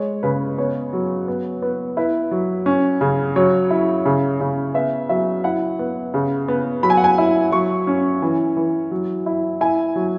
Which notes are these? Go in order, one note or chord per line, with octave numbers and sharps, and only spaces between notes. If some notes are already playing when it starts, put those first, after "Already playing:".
Already playing: G#3 C#5
C#3 B4
B3 C#5
F#3
B3
B3
E4 B4
F#3
C#4
C#3
F#3 C#5
E4
C#3
C#3
B3 E5
F#3 E5
E4 F#5
B3
C#3
B3
F#3 B5
G#5
F#5
G#5
E4
F#3 C#6
C#4
E3
E3
F#3
E4
E4 G#5
F#3